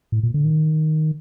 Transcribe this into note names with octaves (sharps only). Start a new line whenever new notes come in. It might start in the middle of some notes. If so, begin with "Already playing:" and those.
A2
A#2
D3
D#3